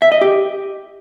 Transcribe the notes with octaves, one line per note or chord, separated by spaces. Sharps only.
E5
D#5
G4